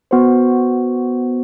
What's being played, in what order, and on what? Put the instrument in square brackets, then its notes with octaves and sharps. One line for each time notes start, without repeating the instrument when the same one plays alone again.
[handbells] B3 F#4 C5